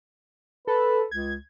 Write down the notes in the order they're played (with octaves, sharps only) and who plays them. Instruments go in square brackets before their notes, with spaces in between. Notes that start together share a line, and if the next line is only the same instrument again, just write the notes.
[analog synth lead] A4 [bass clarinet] B4
[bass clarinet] C#2 [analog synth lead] G#6